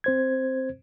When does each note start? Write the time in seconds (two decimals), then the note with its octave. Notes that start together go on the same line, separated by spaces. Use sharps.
0.04 C4 C5 G#6